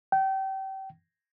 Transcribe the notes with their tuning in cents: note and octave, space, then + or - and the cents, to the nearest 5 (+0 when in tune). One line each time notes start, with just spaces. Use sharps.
G5 -30